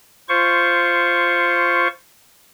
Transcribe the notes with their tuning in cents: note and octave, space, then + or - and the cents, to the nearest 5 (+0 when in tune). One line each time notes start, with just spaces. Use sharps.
F4 -10 C5 +0 C#6 +0